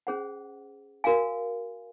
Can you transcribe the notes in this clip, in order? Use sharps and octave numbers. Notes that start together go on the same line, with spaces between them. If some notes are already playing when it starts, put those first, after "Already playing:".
C#4 G#4 C5 F#5
F#4 A#4 F5 G#5